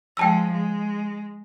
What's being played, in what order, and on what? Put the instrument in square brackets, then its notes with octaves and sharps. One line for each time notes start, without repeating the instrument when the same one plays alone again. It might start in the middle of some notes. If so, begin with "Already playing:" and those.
[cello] F3 G#3 [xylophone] G5 A5 E6
[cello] G#3